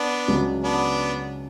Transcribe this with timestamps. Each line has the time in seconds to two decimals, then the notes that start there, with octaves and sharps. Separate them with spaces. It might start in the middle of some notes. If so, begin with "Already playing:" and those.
Already playing: B3 D4
0.28 C#2 C#3 F#3
0.64 B3 D4